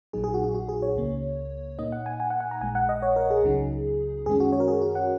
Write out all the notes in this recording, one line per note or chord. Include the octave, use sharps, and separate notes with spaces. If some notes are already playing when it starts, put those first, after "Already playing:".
A#1 A#2 F#3 D#4 G#4
G#4
F#4
F#4
F#4
G#4
C#5
C#2 C#3 A#3
A#2 A#3 D#4 D#5
F#5
G#5
G#5
F#5
F#5
A#5
A#1 A#2 G#3 G#5
F#5
D#5
C#5
A#4
G#4
C#2 C#3 F#3 D#4
F#2 D#3 G#3 C#4 G#4
F#4
C#5
A#4
G#4
F#4
F#5